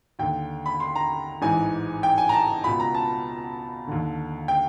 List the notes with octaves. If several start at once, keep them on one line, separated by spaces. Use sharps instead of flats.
D#2 D3 G5
B5
C6
A#5
A1 G#2 E3 G#5
G5
G#5
A#5
A5
C#2 B2 B5
A#5
A5
D#2 D3
G5